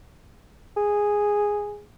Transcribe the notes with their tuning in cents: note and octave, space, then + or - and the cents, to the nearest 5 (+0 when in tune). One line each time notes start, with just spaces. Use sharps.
G#4 -5